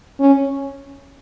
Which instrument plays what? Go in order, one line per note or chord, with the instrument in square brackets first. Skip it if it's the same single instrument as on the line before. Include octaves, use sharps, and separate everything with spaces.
[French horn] C#4